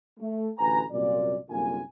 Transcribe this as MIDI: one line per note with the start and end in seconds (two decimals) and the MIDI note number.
0.20 0.49 57
0.59 0.82 33
0.59 0.82 38
0.59 0.82 71
0.59 0.82 80
0.59 0.82 82
0.91 1.36 36
0.91 1.36 42
0.91 1.36 46
0.91 1.36 74
1.50 1.79 36
1.50 1.79 42
1.50 1.79 50
1.50 1.79 58
1.50 1.79 65
1.50 1.79 80